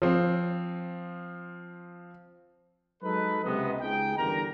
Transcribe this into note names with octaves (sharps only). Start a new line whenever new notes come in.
F3 C4
F#3 G#3 D#4 A4 B4
C#2 C3 B3 D#5
C#2 G#3 D#4 G#4 G5
E2 G2 D3 G4 A#4 A#5